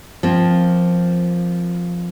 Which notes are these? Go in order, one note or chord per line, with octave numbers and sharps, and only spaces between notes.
F3 A#3 C4